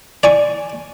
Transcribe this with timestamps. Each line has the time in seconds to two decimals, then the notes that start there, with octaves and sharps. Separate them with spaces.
0.23 D5 G#5 C#6